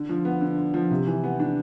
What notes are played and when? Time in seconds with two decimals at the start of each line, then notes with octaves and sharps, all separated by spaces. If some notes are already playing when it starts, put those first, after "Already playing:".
Already playing: D3
0.09 F3
0.25 B3
0.41 D3
0.57 D3
0.74 F3
0.91 C3
1.07 E3
1.24 B3
1.40 D4